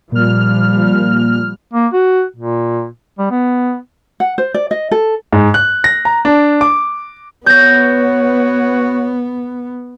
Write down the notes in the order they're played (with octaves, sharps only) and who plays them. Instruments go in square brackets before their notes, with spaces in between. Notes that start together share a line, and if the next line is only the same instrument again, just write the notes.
[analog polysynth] A#2 F6 [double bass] F3 G3
[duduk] A#3
F#4
A#2
G3
B3
[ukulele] F#5
C5
D5
D#5
A4
[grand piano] G#2
F#6
A#6
A#5
D4
D6
[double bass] B3 [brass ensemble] F#4 B4 C#5 [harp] G6 A#6